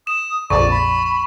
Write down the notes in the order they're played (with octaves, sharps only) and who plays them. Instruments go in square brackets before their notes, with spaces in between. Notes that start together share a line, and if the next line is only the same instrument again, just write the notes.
[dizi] D#6 [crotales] E7
[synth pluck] A#1 F2 [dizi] D5 [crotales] C#6
[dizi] B5